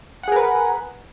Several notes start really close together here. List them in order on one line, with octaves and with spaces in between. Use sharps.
F#5 G#4 A#4 B4